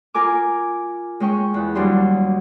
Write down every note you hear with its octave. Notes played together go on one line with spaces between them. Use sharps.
F4 A#4 G#5 D6
G#3 C#4 G5 C#6
E2 F#6
D#2 F#3 G3 D4 C6